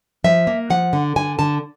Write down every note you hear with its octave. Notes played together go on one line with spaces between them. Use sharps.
F3 E5
A#3
F3 F#5
D3
D3 G#5
D3 A5